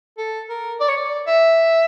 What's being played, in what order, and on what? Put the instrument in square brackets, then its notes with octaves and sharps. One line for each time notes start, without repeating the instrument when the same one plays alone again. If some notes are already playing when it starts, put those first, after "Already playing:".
[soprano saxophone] A4
A#4
D5
C#5
D5
E5